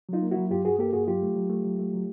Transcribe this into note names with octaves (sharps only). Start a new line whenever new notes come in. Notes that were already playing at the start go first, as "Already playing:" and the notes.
F#3 D#4 F4
A#3
F#3 E4 F#4
G2 F4 G4
G2 F#4 G#4
A#3 G4 A4
G2 F#4 G#4
F#3 F4 G4
A3
F#3
A3
F#3
A3
F#3